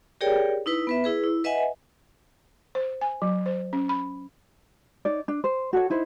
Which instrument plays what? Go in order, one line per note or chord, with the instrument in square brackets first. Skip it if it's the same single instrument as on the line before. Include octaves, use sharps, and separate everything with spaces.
[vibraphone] G4 G#4 A#4 C#5 D5 G5
D#4 E4 B4
B3 B4 E5
E4 G#4 B4
E4
B4 D#5 E5 F#5 G#5
[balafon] C5
G#5
F#3
C5
C#4
B5
[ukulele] D#4 C#5 D5
D4
C5
F#4 A4 C#5
D#4 E4 C5